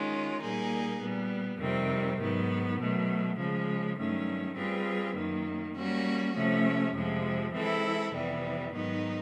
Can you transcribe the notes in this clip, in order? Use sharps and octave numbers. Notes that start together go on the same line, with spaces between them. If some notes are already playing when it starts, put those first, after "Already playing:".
Already playing: D#3 G#3 C#4 F4
A#2 G3 A#3 D#4 G#4
A#2 G3 B3
F2 C3 D#3 G3 C4
G#2 D#3 F#3 B3
B2 F#3 A3
C#3 F3 G#3
G2 D#3 F#3 A3 C#4
G3 C4 F4 G#4 B4
F#2 D#3 F#3 A#3
G3 A#3 C#4 F#4
C3 F3 A3 C#4
F2 C3 F3 G#3
E3 G#3 C4 E4 A4
F2 C3 E3 G3 B3
G#2 D#3 F#3 B3 D#4